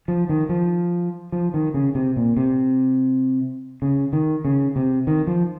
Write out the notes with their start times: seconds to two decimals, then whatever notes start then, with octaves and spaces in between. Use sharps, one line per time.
0.08 F3
0.29 D#3
0.49 F3
1.32 F3
1.54 D#3
1.74 C#3
1.95 C3
2.16 A#2
2.37 C3
3.82 C#3
4.13 D#3
4.45 C#3
4.76 C3
5.07 D#3
5.27 F3